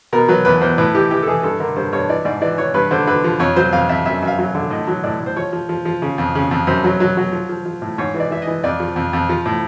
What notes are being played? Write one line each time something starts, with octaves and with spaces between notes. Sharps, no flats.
B2 A#4
F#3 B4
E2 B4
E2 C5
A2 B4
E3 G4
E3 G4
A4
E3 G#4
G2 A4
D3 A#4
G2 C5
G2 C#5
E3 D5
G#2 D5
E3 D5
E3 C#5
G2 B4
D3 C5
D3 B4
F3
F2 C#5
F#3 C5
F2 F5
F2 E5
F#2 E5
F#2 E5
F5
F#3
D3
A2 D#5
F#3
A2 D5
A2
C5
F3 C#5
F3
F3
F3
C#3
F2
C#3
F2
F#2 C5
F#3
F#3
F#3
F3
F3
F3
A2
G#2 C#5
E3
D5
E3 E5
D#5
E3
F2 D5
F3
F2
F2
F3
A2